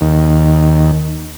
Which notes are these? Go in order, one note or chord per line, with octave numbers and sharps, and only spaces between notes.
D#2